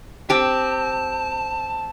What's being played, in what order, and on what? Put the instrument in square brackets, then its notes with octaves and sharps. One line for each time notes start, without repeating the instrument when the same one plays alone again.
[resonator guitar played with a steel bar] C4 G4 [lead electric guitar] A5